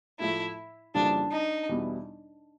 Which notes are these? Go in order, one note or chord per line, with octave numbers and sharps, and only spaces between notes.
A2 F3 A3 E4
F2 C#3 E3 G3 A#3 D4
D#4
E2 B2 G3 B3 E4